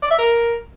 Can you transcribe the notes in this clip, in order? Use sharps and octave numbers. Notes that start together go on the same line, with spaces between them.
D5
E5
A#4